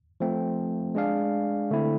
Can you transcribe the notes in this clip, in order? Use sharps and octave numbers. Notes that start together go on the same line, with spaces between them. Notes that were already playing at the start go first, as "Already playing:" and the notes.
F3 A3 C4
G#3 D4 G#4 D5 F5
D3 A3 C4 E4